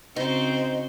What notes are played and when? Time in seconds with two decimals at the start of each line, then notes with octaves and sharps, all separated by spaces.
0.16 C#3 C4 D#4 F#4 C5